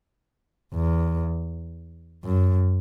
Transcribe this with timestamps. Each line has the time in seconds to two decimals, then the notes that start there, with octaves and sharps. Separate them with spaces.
0.75 E2
2.25 F#2